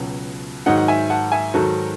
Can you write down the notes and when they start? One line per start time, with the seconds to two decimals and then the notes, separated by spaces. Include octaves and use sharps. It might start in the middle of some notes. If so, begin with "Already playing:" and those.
Already playing: C#2 B2 F#3
0.66 G#2 D#3 F#3 D#5 F#5
0.77 F#5
0.88 E5 G#5
1.10 F#5 A5
1.32 E5 G#5
1.54 G#2 D#3 F#3 F#4 A4